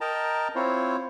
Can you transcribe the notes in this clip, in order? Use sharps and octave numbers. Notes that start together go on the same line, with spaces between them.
A#4 D#5 G5 A5 A#5
C4 E4 F4 C5 C#5